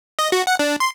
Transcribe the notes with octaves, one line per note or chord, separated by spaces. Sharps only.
D#5
F#4
F#5
D4
C6